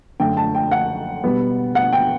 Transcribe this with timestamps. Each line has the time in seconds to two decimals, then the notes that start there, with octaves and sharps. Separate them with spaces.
0.20 F#2 D3 A3 G5
0.37 A5
0.55 G5
0.71 F#5
1.24 B2 G3 B3
1.75 F#5
1.93 G5